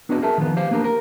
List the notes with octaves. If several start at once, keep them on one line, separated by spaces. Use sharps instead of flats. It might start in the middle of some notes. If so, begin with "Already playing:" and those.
B3 D4 F#4 B4 D#5
G#4 A#4 E5 A5
D#3 F3 B3
G4 C5 F5
A#3 B3 D4 G4 A#4
A#4